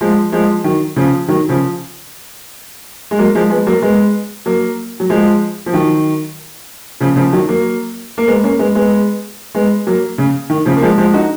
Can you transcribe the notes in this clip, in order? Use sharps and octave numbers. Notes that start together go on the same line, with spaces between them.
F3 G#3
F3 G#3
D#3 F#3
C#3 F3
D#3 F#3
C#3 F3
G#3
F#3 A#3
F3 G#3
G#3 B3
F#3 A#3
G#3 B3
F#3 A#3
F#3
F3 G#3
F3
D#3 F#3
C#3 F3
C#3 F3
D#3 F#3
F#3 A#3
A#3
G#3 B3
A#3 C#4
G#3 B3
G#3 B3
G#3 B3
F#3 A#3
C#3
D#3
C#3 F3
A#3
F3 G#3
F3 G#3
D#4 F#4